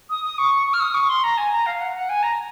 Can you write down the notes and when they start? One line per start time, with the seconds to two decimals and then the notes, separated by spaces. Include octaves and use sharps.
0.10 D#6
0.24 D#6
0.38 C#6
0.67 C#6
0.73 F6
0.80 D#6
0.94 C#6
1.09 C6
1.23 A#5
1.38 G#5
1.52 A#5
1.66 F5
1.80 F#5
1.94 F#5
2.09 G#5
2.23 A#5